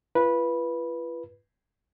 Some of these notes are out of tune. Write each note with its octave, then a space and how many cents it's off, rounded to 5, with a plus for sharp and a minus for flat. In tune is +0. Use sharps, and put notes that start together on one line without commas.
F4 -40 B4 -15